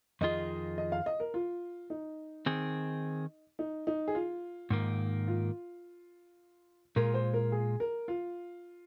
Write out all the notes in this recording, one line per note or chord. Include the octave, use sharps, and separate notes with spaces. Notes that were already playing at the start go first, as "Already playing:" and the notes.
F2 D#3 A#3 F4 G#4 D#5
D#5
F5
D#5
A#4
F4
D#4
D#3 C4 G#4
D#4
D#4
G#4
F4
G#2 D#3 A#3
F4
A#2 G#3 F4 A#4
C5
A#4
G#4
A#4
F4